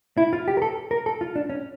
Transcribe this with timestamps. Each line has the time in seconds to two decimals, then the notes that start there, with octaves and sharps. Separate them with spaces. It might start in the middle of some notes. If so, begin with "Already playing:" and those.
0.17 E4
0.33 F4
0.48 G4
0.57 A#4
0.62 A4
0.91 A#4
1.06 A4
1.21 F4
1.36 D4
1.49 C#4